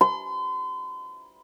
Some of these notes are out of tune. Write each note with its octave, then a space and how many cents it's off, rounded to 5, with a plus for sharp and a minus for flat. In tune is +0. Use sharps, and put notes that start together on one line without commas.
C6 -40